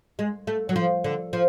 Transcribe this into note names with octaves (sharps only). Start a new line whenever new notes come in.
G#3
A3
F#3
F3
D3
F3